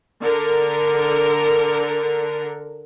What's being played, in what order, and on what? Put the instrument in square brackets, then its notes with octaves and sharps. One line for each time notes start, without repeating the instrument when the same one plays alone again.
[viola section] D3 A#4